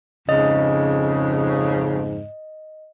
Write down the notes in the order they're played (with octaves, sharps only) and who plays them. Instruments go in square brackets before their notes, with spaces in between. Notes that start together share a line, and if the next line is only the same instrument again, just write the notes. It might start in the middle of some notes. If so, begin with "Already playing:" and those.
[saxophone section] F2 G#2 C#3 [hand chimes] D#5